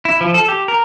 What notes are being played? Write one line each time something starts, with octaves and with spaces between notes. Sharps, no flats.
E4
F3
A4
G4
A#4